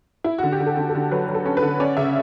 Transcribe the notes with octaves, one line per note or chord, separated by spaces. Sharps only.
E4
D3 F#4
G4
D3
A4
D3
A4
D3
F#3 B4
F#3
A4
C#4
B4
D3
C#4 D5
C#3 E5